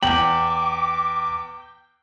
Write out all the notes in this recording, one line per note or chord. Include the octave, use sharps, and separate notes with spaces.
E2 G5 D6 F#7